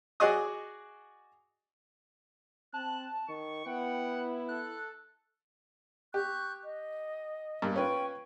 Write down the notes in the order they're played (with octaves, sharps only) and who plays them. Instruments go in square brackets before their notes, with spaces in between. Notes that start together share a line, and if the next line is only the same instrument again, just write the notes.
[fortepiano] F#4 G#4 D5 D#5 D#6
[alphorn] C4 [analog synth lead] A5 [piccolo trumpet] F#6
[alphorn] D#3 [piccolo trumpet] C#6
[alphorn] B3 [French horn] E4 [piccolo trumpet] F#5 [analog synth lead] G5
[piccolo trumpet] A4 [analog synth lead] F#6
[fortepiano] G4 [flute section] C#6 F#6 G6
[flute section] D#5
[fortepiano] G2 A#3
[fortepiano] C#4 F4 B4 [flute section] G5 C#6